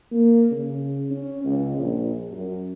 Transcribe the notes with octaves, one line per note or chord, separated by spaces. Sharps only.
A#3
C#3
C#4
C#2
A#1
F#2